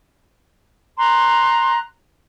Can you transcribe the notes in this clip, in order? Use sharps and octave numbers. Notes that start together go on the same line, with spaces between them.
A#5 C6 F#6